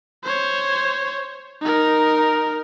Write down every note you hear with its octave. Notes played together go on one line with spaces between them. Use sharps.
C5 C#5
D#4 A#4